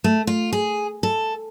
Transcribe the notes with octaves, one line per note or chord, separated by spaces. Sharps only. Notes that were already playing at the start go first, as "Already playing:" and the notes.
A3
F4
G#4
A4